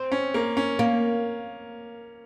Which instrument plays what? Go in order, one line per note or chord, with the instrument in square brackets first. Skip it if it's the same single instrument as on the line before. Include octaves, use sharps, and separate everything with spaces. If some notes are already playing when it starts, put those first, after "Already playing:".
Already playing: [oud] C4
[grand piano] C#4
A#3
C#4
[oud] A#3